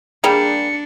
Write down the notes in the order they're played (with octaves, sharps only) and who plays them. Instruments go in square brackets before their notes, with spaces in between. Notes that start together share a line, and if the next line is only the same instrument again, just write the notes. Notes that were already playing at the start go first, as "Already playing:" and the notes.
[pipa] G3 A#3 [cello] D4 [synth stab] G#4 G5 [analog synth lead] C#7